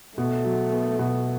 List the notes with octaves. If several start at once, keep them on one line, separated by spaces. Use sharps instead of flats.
B2 A3
F#3
B3
B2